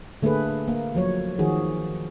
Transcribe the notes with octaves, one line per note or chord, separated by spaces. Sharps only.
D3 A3 A#3 G#4 B4
A#3
F3 F#3 C#5
D#3 F3 F#4 G#4